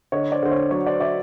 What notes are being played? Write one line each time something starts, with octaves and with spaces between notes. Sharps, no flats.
D3 C#5 D#5
C5 D5
D3 C5
C#5
F#3 C#5
C5 D5
D5 E5